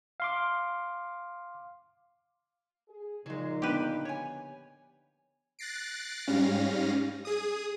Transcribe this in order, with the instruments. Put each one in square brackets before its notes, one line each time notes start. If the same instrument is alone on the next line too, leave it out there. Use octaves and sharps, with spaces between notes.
[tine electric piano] F5 C6 D6
[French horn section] G#4
[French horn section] A#2 D#4 [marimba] C#3 F3 [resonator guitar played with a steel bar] F#3 G#3
[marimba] D3 B3 D4 [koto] G4 B4
[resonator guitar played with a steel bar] C#5 G#5
[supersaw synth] F#6 A6 A#6 C7 D7
G#2 G3 C#4 F5 A#6
G#4 D#6